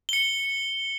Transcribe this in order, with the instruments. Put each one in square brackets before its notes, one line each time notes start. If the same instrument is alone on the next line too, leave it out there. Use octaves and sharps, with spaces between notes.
[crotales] C#7 G7